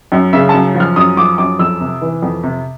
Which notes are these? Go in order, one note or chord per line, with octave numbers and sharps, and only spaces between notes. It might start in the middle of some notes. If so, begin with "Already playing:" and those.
F#2
C#3 E5
F#2 A5
F3
F6
F#2 D#6
F3 D6
F#2 D6
F2 E6
C3
E3
F2
C3